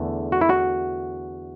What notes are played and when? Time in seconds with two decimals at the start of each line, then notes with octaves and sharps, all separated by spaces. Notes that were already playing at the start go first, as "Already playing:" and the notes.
Already playing: E2 D3 A3
0.32 F#4
0.41 E4
0.49 F#4